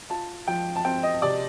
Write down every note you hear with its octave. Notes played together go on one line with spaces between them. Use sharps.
F4 A5
F3 G5
A5
C4 G5
D#5
C3 D5